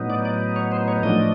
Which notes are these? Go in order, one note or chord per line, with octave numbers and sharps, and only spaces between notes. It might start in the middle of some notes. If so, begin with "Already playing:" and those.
Already playing: A2 F#3 B3 D#4
D5
D5
C#5
C5
C#5
A2 F3 A3 D4 D#5